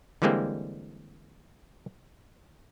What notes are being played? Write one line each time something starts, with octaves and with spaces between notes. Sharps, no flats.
D3 E3 G3 G#3 A#3 C4